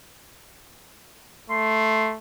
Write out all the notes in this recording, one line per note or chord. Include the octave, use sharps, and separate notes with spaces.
A3 C6